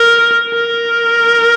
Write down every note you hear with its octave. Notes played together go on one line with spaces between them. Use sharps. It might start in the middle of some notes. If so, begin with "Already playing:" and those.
Already playing: A#4
A#4